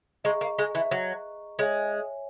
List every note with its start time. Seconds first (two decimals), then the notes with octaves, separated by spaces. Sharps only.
0.24 G#3 G#4 D#5 A#5 C#6
0.41 A#3
0.59 G#3
0.75 E3
0.91 F#3
1.59 G#3 C#5 E5 G#5